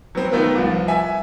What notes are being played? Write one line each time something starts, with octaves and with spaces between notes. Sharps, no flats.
F#3 B3 C4
D#3 A3 B3 F4 A#4
C2 F3
E5 G#5